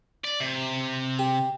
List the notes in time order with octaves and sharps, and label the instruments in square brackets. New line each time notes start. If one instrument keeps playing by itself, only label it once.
[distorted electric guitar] D5
C3
[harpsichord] G4